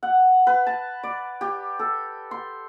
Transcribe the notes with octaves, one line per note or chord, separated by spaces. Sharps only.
F#5
B4
A5
D5
G4
A4
C6